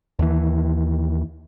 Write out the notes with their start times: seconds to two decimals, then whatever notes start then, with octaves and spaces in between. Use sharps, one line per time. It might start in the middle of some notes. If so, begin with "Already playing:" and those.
0.19 D#2 E3